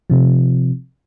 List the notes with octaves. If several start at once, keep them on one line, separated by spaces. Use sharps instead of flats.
C3 F3